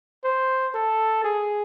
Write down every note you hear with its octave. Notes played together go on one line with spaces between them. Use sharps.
C5
A4
G#4